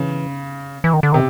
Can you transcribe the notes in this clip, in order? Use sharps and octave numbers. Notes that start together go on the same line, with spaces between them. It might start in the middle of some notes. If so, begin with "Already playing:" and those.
Already playing: C#3 E3
E3
D#3
D3
C3 D#3